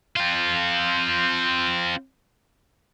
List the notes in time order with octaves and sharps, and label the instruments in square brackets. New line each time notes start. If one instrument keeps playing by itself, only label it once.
[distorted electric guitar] C4 F4